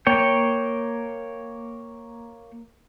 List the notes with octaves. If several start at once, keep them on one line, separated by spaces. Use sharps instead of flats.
A#3 C#5 G5